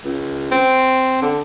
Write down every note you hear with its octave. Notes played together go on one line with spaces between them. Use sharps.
C#2
C4
D3